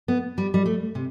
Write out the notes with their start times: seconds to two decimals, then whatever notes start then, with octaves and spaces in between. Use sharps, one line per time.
0.08 B3
0.38 G3
0.54 G3
0.66 A3
0.95 C3